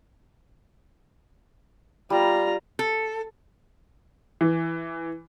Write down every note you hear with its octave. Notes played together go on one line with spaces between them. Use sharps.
G3 F4 A#5
A4
E3